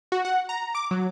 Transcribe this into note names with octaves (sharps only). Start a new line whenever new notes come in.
F#4
F#5
A#5
D6
F#3